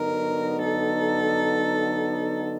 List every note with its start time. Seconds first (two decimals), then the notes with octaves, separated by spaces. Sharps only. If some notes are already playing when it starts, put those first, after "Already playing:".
Already playing: D3 F#3 B3 D#4 A#4
0.66 A4